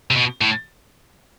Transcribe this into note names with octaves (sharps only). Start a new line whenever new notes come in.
C3
B2
A2